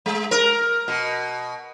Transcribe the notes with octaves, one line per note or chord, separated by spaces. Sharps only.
G#3
A#4
B2